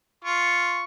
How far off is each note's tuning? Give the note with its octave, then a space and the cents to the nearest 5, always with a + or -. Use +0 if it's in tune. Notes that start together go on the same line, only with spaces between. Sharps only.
F4 +0 C#6 +0